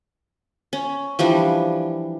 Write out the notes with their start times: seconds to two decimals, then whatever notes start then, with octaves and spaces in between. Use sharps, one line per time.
0.73 C#4
1.19 E3 F3 G3 D4